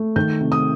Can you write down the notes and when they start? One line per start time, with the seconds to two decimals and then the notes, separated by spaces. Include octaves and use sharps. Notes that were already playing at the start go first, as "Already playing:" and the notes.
Already playing: A3
0.16 D#3 G6
0.40 C3
0.52 D#6